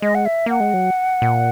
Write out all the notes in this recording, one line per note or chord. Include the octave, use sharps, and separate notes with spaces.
G#3 D#5
F#5
E5
A#3 F#5
G#3
F#3
A#2